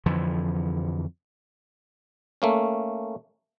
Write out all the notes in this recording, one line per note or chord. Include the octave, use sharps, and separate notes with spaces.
F2 D3 E3 F3
A3 A#3 C#4